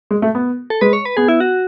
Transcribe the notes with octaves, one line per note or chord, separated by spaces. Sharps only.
G#3
A3
B3
A4
G#3 B4
C#5
B4
B3 G#4
E4
F#4